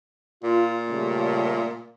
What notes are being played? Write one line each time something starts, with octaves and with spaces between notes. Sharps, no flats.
A#2 F4
C#3 G3 A3